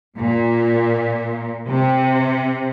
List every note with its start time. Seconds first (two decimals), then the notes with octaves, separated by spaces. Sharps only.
0.17 A#2
1.70 C3